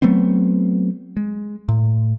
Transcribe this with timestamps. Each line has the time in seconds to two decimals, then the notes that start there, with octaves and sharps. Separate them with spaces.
0.02 F#3 A3 B3 C4
1.17 G#3
1.69 A2